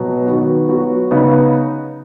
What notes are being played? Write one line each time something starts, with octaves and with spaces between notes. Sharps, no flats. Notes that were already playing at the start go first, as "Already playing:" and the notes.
Already playing: B2 F#3
D#3 B3 D#4 F#4
F#3 B3 F#4
C#3 B3 D#4